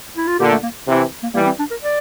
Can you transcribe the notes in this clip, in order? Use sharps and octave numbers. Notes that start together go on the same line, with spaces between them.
E4
F4
A#2 D3 G4
A3
A#3
C3 E3
A#3
E3 G3 A#3
C4
D4
A#4
D5